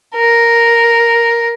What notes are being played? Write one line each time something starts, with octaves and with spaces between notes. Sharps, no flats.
A#4